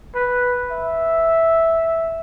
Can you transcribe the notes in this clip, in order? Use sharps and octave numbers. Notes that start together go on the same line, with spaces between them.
B4
E5